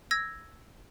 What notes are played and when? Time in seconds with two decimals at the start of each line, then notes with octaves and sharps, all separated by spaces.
0.11 E6 G#6 A#6